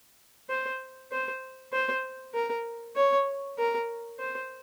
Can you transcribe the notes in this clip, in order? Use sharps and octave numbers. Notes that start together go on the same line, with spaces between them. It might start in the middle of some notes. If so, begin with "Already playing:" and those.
C5
C5
C5
A#4
C#5
A#4
C5